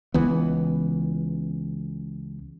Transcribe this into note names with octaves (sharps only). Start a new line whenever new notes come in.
C#2 E3 B3